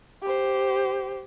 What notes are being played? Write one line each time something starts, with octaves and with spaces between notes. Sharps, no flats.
G4 C5